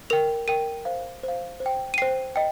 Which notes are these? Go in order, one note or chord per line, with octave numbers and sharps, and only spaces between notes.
A#4 G5 F7
A#4 G5 D#7
C5 F5
C5 F5
C5
G5
D#7
C5 G5 C7
D#5 G5